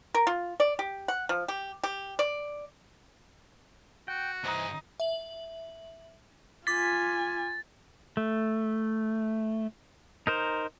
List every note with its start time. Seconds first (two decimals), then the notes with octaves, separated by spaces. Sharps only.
0.14 A#4
0.27 F4
0.60 D5
0.79 G4
1.08 F#5
1.29 F3
1.48 G4
1.84 G4
2.19 D5
4.08 F#4 G5
4.43 G2 E3 D#4 C5
5.00 E5 F#7
6.67 F4 G#5 D6 A6 B6
8.17 A3
10.27 D#4 A#4 C5